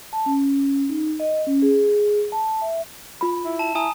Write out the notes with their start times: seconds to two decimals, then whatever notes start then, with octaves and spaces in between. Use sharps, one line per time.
0.13 A5
0.26 C#4
0.89 D#4
1.20 D#5
1.47 C#4
1.62 G#4
2.32 A5
2.61 E5
3.21 F4 B5
3.45 E4
3.59 A5 E7
3.75 E4 G#5 A#5 D#6